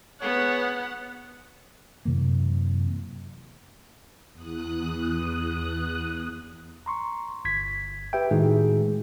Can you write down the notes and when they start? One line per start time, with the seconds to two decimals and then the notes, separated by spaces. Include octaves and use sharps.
0.22 B3 G#4 C#5 F#5
2.05 F#2 C3 E3 A#3
4.33 E2 D#6 F#6
6.86 A#5 C6 C#6
7.45 G1 G#6 B6
8.13 G4 B4 E5 G5
8.31 A2 D#3 G#3 D#4 F#4 G#4